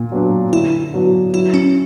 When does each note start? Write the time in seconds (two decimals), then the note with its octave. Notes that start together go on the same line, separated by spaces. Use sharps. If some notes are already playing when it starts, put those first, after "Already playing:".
Already playing: A#2
0.12 F#3 B3 D4
0.52 D3 E4
0.94 F#3 B3 D4 F#4
1.34 F#3 E4
1.54 C#4